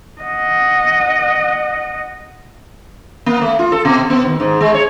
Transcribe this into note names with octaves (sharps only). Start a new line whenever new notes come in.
D#5 F#5
A#3
A3
F4
A4
B2
B3
D#2
G#2
G#3
C#5